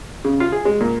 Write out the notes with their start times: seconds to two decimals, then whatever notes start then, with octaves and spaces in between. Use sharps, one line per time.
0.25 C#3
0.40 F4
0.52 G#4
0.65 G#3
0.80 A#2